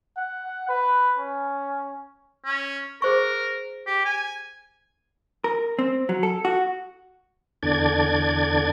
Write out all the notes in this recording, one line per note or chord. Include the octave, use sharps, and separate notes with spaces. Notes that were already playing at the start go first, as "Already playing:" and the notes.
F#5
B4
C#4
C#4
G#4 A#4 C5 C#6
G4
G#5
A#4
C4
F#3
A4
F#4
E2 D3 D4 D5 G#6